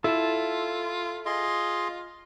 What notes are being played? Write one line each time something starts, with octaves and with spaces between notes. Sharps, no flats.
E4 F4 A4 A5
F4 G#4 D#5 C6